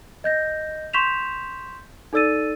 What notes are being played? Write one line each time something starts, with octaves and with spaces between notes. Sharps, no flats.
D#5 G6 A#6
C6 C#6 G6 B6 E7 F7
D#4 A4 D5 E6 A6 D#7